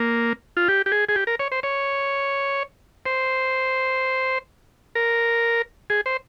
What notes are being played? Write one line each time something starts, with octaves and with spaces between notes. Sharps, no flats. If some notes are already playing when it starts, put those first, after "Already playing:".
Already playing: A#3
F4
G4
G4
G#4
G#4
G4
A#4
C#5
C5
C#5
C5
A#4
G#4
C5